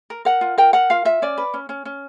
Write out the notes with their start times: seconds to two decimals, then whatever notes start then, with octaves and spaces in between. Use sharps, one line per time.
0.10 A#4
0.25 A#4 F#5
0.41 F4
0.58 A#4 G5
0.73 A#4 F#5
0.90 F4 F5
1.05 F4 E5
1.22 C#4 D5
1.38 B4
1.54 C#4
1.69 C#4
1.85 C#4